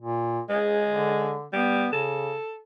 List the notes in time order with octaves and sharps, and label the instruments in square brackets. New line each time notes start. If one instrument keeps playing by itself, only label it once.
[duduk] A#2
[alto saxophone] G#3 [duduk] G#4
[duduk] D3
[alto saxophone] G3 [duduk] B3
[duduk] C#3 [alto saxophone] A4